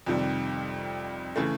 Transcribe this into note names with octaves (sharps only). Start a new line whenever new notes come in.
F2 C3 D#3 G3
C#3 E3 A3